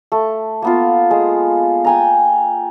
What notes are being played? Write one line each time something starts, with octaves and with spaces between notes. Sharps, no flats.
A3
A#3 B3 F4
G#3
G5 G#5 A#5